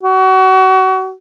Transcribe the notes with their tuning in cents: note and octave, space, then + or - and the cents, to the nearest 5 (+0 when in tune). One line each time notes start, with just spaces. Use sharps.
F#4 +30